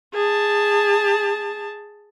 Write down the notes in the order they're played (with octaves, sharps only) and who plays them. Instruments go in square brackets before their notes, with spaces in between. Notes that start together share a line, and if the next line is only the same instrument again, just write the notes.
[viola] G#4 A5